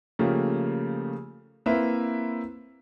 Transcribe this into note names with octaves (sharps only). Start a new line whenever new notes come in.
C#3 F3 A3 A#3 G4
A#3 C4 E4 B4 C5 E5